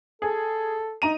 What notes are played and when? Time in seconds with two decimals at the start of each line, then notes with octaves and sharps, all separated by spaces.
0.22 G#4 A4
1.02 D#4 A#5 D#7